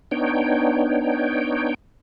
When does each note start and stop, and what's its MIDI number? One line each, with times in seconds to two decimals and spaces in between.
0.11 1.74 59
0.11 1.74 62
0.11 1.74 63
0.11 1.74 73
0.11 1.74 79